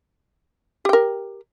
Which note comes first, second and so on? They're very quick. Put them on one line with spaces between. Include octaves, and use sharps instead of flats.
G4 G5 A#4